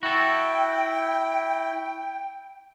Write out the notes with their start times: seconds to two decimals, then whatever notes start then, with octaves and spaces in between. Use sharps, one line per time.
0.03 E4 F#4 A4 G5